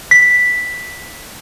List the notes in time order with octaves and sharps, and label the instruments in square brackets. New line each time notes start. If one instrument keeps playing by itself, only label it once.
[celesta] B6